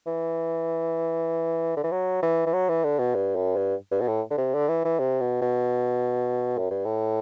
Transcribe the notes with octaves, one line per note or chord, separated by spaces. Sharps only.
E3
D3
E3
F#3
E3
E3
F#3
E3
D3
B2
G2
F#2
G2
G2
B2
A2
D3
C3
D3
E3
E3
C3
B2
B2
F#2
G2
A2